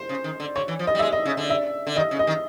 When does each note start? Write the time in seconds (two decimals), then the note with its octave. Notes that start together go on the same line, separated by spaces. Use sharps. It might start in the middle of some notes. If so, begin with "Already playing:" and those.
Already playing: C5
0.09 C#3
0.24 D#3
0.40 D3
0.55 D3 C#5
0.68 E3
0.79 F3
0.87 D#5
0.95 G3
0.99 G#3 E5
1.12 D#5
1.25 C#3
1.37 D3
1.50 E5
1.87 D3
1.96 D#3 D#5
2.11 C#3
2.19 D#5
2.27 D#3